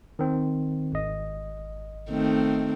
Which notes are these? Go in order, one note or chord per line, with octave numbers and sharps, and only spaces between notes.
D#3 C4
G#1 D#5
D#3 A3 C4